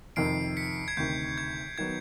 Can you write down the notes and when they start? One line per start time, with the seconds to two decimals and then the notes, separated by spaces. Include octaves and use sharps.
0.16 F2 C3 D#3 C7 D7
0.57 B6 C#7
0.88 G#6
0.97 D2 C3 D#3 G6
1.38 G#6
1.78 D#3 F#3 B3 G#6